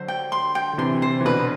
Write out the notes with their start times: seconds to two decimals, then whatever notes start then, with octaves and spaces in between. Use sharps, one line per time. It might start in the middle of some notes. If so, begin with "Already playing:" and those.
Already playing: D3 F#3 C5
0.08 G5
0.32 C6
0.55 G5
0.73 D3
0.78 C3 E3 C6
1.02 C5
1.21 E3
1.25 B2 D3 B4